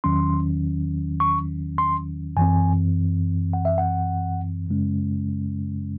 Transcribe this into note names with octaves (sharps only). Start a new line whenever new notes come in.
E2 D#3 F#3 C#4 C6
C#6
C6
F#2 E3 C4 G#5
F#5
E5
F#5
F#2 C#3 G#3 C#4